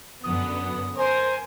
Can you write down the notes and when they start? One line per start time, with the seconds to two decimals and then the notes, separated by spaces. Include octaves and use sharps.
0.23 F#2 D3 B3 D#6
0.98 A#4 C5 G#5